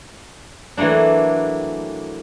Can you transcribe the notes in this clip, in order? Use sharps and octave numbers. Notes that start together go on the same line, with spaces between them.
E3 F#3 A3 A#3 D4